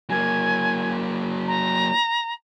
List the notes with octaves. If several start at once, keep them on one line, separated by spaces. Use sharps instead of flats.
F#3 A#3 G#5
A#5